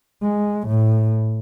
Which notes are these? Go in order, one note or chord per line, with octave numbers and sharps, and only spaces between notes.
G#3
A2